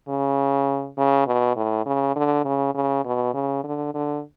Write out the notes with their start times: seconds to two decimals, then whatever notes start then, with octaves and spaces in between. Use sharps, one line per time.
0.09 C#3
0.97 C#3
1.27 B2
1.56 A2
1.86 C#3
2.16 D3
2.45 C#3
2.75 C#3
3.05 B2
3.34 C#3
3.64 D3
3.94 D3